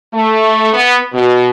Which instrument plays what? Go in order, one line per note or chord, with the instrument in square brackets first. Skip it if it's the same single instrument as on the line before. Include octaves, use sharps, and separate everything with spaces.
[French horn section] A3
B3
B2